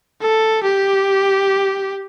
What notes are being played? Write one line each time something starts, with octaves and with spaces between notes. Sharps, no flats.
A4
G4